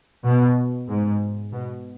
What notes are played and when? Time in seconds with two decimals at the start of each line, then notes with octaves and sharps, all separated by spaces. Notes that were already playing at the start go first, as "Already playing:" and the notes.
0.24 B2
0.89 G#2
1.53 B2